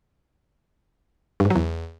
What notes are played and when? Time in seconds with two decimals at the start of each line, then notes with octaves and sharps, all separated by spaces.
1.40 G2
1.45 G#2
1.50 F#3
1.56 E2